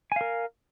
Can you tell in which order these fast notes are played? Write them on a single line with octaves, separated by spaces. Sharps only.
G#5 F5 A#4